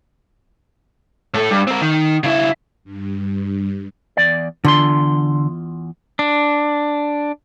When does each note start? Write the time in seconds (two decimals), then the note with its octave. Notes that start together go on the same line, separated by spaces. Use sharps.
1.34 A2 A4
1.50 G2
1.67 C4 A#4
1.82 D#3
2.23 C#3 E4
2.84 G2
4.17 E2 D5
4.65 E2 D3 F4 C6
6.19 D4